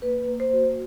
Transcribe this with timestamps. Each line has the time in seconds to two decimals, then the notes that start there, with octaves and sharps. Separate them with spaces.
0.02 A#3 B4
0.28 A#3
0.40 C5
0.53 F#4